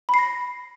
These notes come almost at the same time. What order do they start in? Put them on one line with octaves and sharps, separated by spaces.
B5 C7 A#6